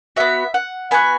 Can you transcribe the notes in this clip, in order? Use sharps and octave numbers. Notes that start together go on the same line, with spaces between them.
B3 F#4 E5
F#5
B3 F#4 G#5